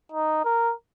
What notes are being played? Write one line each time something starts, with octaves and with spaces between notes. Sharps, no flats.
D#4
A#4